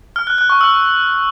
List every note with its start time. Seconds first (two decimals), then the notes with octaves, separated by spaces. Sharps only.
0.16 F6
0.27 F#6
0.38 F#6
0.50 C#6
0.61 E6